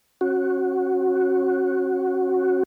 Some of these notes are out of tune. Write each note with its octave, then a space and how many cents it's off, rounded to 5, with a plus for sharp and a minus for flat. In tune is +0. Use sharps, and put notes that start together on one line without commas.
C#4 -30 F#4 +0